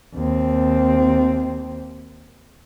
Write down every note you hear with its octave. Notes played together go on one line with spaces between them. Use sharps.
D#2 C4